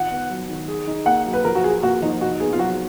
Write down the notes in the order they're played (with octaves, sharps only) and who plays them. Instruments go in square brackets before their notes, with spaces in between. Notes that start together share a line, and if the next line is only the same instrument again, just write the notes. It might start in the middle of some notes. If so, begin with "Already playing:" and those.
Already playing: [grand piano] D#3 F4 [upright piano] F#5
[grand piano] B3
F#3
D#3
G#4
D#4
[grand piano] A#3 [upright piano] F#5
[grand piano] F#3
[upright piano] B4
[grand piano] F3 [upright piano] A#4
[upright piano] F#4
[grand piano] F4 [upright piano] G#4
[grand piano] A#3 [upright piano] F#4
[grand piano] F3 [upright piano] D#4
[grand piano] D#4 [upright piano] F#4
[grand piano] B3 [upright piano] G#4
[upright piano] F4
[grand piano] F#3 [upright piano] F#4